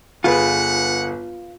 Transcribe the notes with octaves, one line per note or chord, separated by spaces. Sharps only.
G1 F4 G#4 B4 F#5